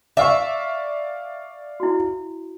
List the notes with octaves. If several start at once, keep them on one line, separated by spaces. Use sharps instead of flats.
D5 E5 F5 C#6
E4 F#4